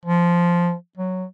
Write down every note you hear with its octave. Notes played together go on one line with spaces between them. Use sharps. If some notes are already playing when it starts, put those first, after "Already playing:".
F3
F#3